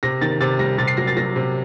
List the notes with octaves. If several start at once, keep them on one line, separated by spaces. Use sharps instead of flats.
C3 A#6
D#3 A6
C3 A6
G3 A#6
C3 A6
C7
F#3 A#6
A6
F#3 A#6
C3